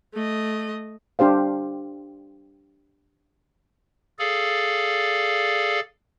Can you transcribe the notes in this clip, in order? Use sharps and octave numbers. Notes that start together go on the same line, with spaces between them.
A3 D#5
D4 G4 C5 F5
G#4 A4 D5 F5